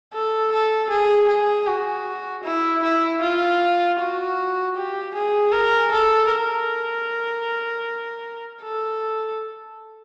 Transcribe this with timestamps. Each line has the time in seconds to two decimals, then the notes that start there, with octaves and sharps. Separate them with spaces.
0.13 A4
0.52 A4
0.89 G#4
1.28 G#4
1.66 F#4
2.44 E4
2.82 E4
3.22 F4
3.99 F#4
4.76 G4
5.15 G#4
5.52 A#4
5.92 A4
6.31 A#4
8.62 A4